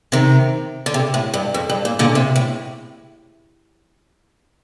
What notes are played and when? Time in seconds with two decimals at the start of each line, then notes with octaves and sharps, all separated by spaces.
0.12 C3 D#3
0.86 D3
0.94 C3
1.14 A2
1.34 G2
1.54 F2
1.69 G2
1.85 A#2
1.99 A#2 D3
2.15 C3
2.36 A2